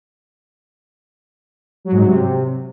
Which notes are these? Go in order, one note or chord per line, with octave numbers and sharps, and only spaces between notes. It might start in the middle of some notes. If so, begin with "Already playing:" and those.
F#3
G#2
F#3
C3